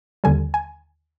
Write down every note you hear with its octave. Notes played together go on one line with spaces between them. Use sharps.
D#2 D3 G3 G#5
G#5